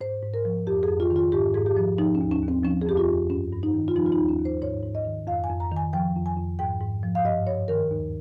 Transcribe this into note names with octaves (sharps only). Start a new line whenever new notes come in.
G#2 C5
G#2
A#4
F3
F2 G4
G#4
F2
F4
D#3
F4
G#2 G4
G#2 G#4
G4
F3
F3 D#4
C#4
D#2
C#4
D#2
C4
F3 C#4
G#4
F2 G4
F4
F2
G2 C#4
G2
D#4
D#3
F4
F3 D#4
F4
D#4
D#2
C#4
D#2
C5
G#2 C#5
G#2
D#5
D#3
F2 F5
G#5
F2
A#5
D#3 G#5
F3 G5
F2
G#5
F2
G#2 G5
G#2
F3
F5
G2 D#5
G2 C#5
D#3 A#4
D#2